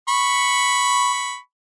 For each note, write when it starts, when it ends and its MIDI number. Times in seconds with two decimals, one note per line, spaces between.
0.09 1.38 83
0.09 1.38 85